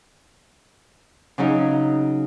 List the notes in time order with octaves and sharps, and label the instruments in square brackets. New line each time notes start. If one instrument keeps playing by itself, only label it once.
[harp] C#3 F#3 C#4 D#4